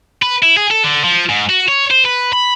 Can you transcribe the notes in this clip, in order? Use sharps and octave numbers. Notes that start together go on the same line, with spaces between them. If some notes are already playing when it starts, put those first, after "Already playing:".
B4
E4
G#4
A4
D3
F3
G#2
F#4
C#5
C5
B4
B5